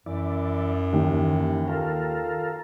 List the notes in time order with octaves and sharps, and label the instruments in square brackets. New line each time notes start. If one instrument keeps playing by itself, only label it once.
[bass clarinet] F#2 [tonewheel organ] E3 E4 D5
[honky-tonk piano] D#2 [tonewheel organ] E3
[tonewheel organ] F4 A4 A#4